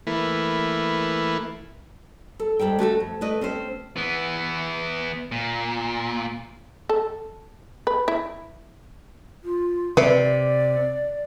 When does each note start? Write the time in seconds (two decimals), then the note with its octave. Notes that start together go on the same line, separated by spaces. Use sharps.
0.07 E3 A3 A#3 E4 B4
2.39 A4
2.59 G#2 B2 G3 A4 G5
2.79 A3 F#4 G4 A4
3.00 F2
3.21 A3 E4 B4 D#5
3.41 C4 C#4 A4 C5
3.96 E3 B3
5.32 A#2
6.89 A4
7.87 B4
8.08 E4
9.44 F4
9.97 C3 B4 D5 E5